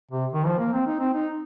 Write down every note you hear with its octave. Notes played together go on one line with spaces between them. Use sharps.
C3
D#3
F3
A#3
C4
D#4
C4
D#4